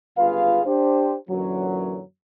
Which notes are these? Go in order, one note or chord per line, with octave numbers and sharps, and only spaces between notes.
G1 C#2 F4 G#4 B4 F5
D4 G4 C5
F#2 A#2 D3 E3 F#3